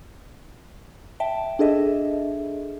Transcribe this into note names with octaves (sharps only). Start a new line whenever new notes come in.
E5 G5 A5
D4 G#4 A4 D#5 E5